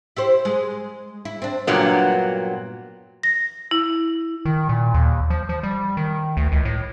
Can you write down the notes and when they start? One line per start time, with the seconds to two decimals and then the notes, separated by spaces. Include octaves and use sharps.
0.17 E4 G4 C5
0.45 G#3
1.25 E4
1.42 C4 D4
1.67 G2 A#2 F#3 B3
3.23 A#6
3.71 E4
4.45 D#3
4.69 A#2
4.94 D#2
5.30 F3
5.49 F3
5.63 G3
5.97 D#3
6.37 D2
6.52 C#2
6.65 A2